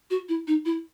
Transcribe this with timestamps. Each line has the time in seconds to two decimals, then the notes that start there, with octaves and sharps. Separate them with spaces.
0.10 F#4
0.29 E4
0.47 D#4
0.65 E4